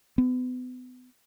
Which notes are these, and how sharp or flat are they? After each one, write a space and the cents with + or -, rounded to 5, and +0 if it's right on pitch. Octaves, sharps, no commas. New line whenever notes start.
B3 +35